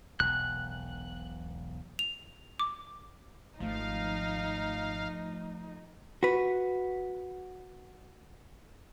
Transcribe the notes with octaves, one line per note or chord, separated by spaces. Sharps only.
E1 B1 F#6
F7
D6
G#1 F3 A3 D#4 F5
F#4 B4